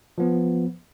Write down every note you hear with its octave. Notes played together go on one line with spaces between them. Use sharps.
F3 B3